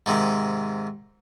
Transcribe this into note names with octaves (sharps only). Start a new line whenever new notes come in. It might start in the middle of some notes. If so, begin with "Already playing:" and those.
G#2 C3 D#3